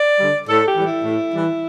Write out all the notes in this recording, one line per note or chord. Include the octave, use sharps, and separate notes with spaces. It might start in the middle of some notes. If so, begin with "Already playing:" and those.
Already playing: D5
D3 G3
A2 A4
G4
E3 G3
E4
A2
E3 G3